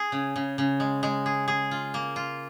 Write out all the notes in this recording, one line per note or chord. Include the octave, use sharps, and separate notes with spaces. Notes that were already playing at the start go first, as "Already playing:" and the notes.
Already playing: G#4
C#3
C#3
C#3
G#3
G#3
G#4
G#4
F4
A#3
F4